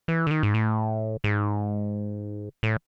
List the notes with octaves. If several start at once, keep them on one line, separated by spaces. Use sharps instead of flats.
E3
D3
D#3
G#2
A2
G#2
A2